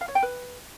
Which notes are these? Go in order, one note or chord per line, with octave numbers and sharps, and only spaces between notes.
F5
C#5
G5
B4